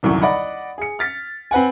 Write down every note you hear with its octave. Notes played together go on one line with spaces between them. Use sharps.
D#1 C2 F#2 D3 E4 C#6
D5 D#5 F#5 B5
G#4 C#7
F6 A6 B6
C4 B4 F#5 G#5